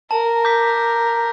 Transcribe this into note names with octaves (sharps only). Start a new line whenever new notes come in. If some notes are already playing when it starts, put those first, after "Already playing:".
A#4 A5
D6 G6 B6